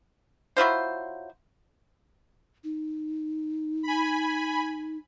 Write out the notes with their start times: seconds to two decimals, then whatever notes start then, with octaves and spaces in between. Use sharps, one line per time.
0.57 F#3 E4 F4 C5
2.64 D#4
3.83 G#5 B5